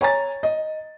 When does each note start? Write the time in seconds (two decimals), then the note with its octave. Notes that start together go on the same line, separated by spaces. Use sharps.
0.01 C#5 G#5 A#5 A6
0.43 D#5